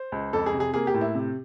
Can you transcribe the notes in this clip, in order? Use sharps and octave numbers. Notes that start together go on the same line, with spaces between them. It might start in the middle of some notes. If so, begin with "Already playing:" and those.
Already playing: C5
C#2
F2 A4
G#4
C3
G#4
A#3 G#4
G4
A2
E4
C3